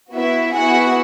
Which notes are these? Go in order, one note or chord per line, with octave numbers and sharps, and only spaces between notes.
B3 E4 F#4 E5
B3 E4 F#4 G#4 F#5